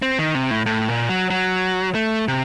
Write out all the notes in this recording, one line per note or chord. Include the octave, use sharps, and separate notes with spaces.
C4
D#3
C3
A2
A2
A#2
F#3
F#3
A3
C3